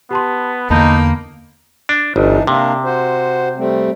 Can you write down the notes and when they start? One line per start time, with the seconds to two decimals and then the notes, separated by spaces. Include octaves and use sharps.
0.11 B3 G4 A5 C6
0.70 E2 D3 A#3 D#4 A5 B5 G6
1.89 D4
2.16 G1 E3 D4 D#4
2.47 C3 A#3 D4 A#4
2.85 F#4 C5
3.58 G3 A3 C4